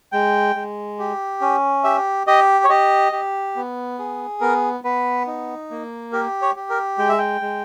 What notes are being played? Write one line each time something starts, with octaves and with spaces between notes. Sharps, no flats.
G#3 G5
G#3
G4
C#4
G4 E5
G4 D#5
C#5
G4 D#5
G4
B3
G#4
B3 A#4
B3 B4
D#4
A#3
G4 A#4
C#5
G4
A#4
G#3 G5
E5
G5
G#3